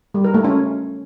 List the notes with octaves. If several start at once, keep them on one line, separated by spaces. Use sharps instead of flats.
G3
A#4
A3
C#4